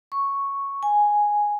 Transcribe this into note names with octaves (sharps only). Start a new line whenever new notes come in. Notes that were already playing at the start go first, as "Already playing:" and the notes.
C#6
G#5